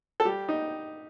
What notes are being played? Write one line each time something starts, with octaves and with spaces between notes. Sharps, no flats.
A4
G3 G4
D#4